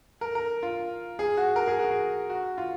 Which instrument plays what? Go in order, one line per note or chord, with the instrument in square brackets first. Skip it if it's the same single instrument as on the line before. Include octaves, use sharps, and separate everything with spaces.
[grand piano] A#4
A#4
F4
G#4
F#4
A#4
G#4
F#4
G#4
F#4
F4